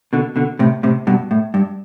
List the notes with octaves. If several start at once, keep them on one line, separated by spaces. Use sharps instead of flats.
B2 D3
B2 D3
A2 C3
A2 C3
G2 B2
A2
G2